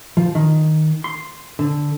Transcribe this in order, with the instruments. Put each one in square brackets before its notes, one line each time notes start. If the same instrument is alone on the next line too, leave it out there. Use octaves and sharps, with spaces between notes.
[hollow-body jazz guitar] F3
D#3
C6
D3